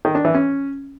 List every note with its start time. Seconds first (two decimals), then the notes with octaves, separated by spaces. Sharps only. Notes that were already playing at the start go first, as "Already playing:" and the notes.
0.05 D#3
0.15 D4
0.25 E3
0.35 C#4